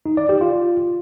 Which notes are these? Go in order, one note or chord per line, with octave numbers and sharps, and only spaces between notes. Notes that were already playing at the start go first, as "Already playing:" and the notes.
D#4
D5
G4
F4